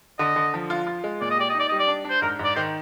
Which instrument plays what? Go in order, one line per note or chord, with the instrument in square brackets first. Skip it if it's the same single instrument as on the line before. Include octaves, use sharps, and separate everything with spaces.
[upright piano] D3 [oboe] D#5
[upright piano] D3
F3
F4
F4
G#3
[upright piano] A#2 [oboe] D5
[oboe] D#5
[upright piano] G4 [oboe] D5
[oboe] D#5
[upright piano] D#4 [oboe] D5
[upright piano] G3 [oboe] D#5
[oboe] D5
[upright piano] D4
D4
[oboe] C5
[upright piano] G#2 [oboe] A#4
[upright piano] G#2 [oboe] D5
[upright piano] D#3 [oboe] C5